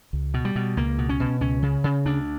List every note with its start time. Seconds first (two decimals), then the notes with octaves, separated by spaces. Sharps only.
0.13 C#2
0.34 B2
0.45 G3
0.56 B2
0.77 C#2 A#3
0.98 B2
1.09 C#4
1.20 B2
1.41 C#2 C#4
1.62 C#3
1.84 C#3
2.05 D2 D4